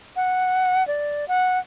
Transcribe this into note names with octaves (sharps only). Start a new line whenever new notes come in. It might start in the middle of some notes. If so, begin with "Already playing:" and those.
F#5
D5
F#5